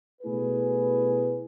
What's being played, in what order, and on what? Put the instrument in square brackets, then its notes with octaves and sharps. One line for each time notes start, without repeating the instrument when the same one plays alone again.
[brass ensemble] B2 A3 E4 G#4 B4